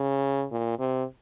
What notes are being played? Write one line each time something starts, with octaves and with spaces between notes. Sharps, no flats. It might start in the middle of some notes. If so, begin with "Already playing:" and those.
Already playing: C#3
A#2
C3